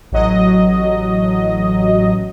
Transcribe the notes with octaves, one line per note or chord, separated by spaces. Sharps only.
A1 F#3 D#5